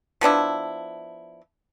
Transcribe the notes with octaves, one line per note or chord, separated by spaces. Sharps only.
F3 B3 D4 E4